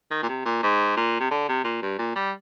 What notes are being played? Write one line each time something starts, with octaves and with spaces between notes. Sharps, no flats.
D#3
A#2
C3
A#2
G#2
A#2
C3
D3
C3
A#2
G2
A#2
G3